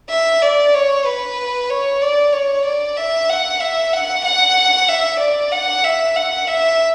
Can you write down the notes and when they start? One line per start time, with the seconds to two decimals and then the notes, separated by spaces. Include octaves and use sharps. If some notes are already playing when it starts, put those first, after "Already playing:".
0.10 E5
0.42 D5
0.74 C#5
1.05 B4
1.70 C#5
2.01 D5
2.33 C#5
2.66 D5
2.97 E5
3.30 F#5
3.60 E5
3.93 F#5
4.25 F#5
4.89 E5
5.20 D5
5.52 F#5
5.84 E5
6.16 F#5
6.48 E5